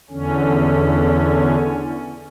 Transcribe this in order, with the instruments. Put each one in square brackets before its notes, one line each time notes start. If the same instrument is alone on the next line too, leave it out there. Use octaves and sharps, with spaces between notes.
[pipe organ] E2 D3 C#4